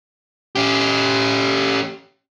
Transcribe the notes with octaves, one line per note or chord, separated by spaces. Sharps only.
C#4 G4